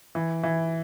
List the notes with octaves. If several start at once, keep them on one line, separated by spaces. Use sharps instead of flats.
E3
E3